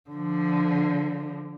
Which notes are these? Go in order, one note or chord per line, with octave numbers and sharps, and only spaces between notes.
D3 F3